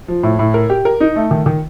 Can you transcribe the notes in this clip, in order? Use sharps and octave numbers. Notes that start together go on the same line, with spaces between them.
F3
A2
A2
A#4
G4
A#4
D#4
A3
D#3
D#3